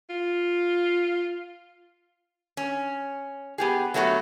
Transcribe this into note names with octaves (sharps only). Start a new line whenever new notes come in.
F4
C#4
B3 G4 G#4
F#3 A3 B3 F4 F#4